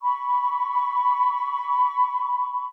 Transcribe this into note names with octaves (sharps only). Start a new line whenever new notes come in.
B5 C#6